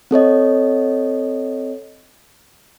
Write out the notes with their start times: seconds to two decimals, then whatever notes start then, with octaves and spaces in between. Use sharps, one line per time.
0.11 C4 A4 C#5 D#5